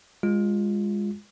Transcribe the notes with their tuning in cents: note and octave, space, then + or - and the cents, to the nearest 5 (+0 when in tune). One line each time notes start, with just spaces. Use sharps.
G#3 -20 F4 +0